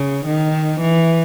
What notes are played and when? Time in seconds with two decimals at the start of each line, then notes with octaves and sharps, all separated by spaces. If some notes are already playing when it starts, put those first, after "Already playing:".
Already playing: C#3
0.26 D#3
0.80 E3